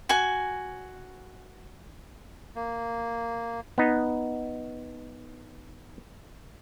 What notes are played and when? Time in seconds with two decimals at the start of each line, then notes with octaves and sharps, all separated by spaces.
0.09 F#4 G#5
2.55 A#3
3.78 B3 D#4